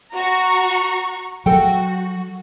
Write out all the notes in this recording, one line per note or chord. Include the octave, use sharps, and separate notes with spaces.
F#4 A#5 C#6
F#3 F#4 A4 G5